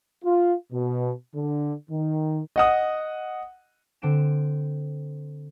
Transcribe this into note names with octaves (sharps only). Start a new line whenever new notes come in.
F4
B2
D3
D#3
D#5 F#5 D#6
D3 C4 C5 D7 E7